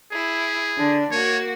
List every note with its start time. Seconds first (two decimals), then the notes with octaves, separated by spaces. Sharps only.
0.12 E4 G#4
0.77 D3 D4
1.11 A#3 F#4 C#5